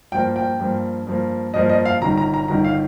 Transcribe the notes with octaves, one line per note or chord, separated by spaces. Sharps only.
G2 F3 A#3 G5
G5
G2 F3 A#3
G2 F3 A#3
G2 F3 A#3 D#5
D#5
F5
G1 G2 D#3 A#5
A#5
A#5
G1 G2 D#3 A#5
F5